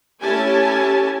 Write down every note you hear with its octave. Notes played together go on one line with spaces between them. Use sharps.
A3 C#4 E4 G4 G#5 A5